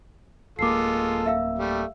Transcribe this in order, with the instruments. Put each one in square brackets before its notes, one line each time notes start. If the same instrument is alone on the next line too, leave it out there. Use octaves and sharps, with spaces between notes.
[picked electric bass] D1 A#3 [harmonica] G#3 F4 A4 [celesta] D6 C7
[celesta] E5 F5 E6
[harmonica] G3 A3